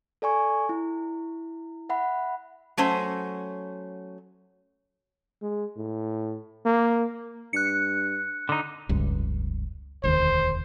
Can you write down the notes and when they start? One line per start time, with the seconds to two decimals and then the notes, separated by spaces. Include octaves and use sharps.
0.22 A4 D5 G#5 C#6
0.69 E4
1.89 E5 F#5 B5
2.77 F#3 A3 C#4 C5
5.42 G#3
5.76 A2
6.65 A#3
7.53 G2 F#6 C#7
8.49 D3 D#4
8.89 F1 C#2 G2
10.03 E1 D2 D#3 C5